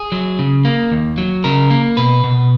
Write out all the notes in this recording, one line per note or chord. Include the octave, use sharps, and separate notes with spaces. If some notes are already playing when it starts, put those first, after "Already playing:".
Already playing: G#4
F#3
C#3
A#3
D#2
F#3
C#3 A#4
A#3
B2 B4
B2